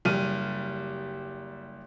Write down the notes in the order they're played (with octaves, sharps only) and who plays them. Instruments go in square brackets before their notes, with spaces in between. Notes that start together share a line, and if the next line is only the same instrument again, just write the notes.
[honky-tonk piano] F#1 G3 F6 D#7